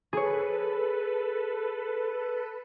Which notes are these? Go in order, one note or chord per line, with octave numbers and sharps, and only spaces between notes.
G#4 A4 B4 C#5